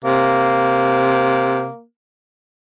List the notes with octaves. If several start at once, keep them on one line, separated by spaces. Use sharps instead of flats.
C3 A#3